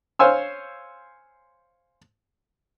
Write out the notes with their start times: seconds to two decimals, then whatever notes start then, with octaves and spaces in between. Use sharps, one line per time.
0.19 C5 C#5 F5 G#5 C6 E6